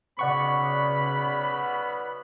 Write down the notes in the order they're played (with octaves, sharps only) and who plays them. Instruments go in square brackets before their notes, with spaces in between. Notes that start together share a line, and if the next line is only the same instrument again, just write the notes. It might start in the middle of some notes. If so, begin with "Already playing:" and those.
[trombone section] B1 B3 [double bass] C#3 [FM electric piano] D5 F#5 C#6 [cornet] B5